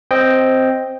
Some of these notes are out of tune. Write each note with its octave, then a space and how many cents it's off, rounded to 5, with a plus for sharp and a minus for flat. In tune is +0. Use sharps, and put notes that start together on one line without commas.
C4 +0 D#5 +0 G5 +0